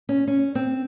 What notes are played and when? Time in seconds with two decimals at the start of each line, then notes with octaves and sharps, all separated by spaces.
0.09 C#4
0.27 C#4
0.55 C4